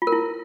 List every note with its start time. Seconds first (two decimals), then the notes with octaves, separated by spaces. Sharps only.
0.02 F4
0.07 A#4
0.12 E4